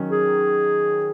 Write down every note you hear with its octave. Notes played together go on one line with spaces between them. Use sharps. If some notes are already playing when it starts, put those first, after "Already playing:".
Already playing: D#3 F#3 C#4
G#4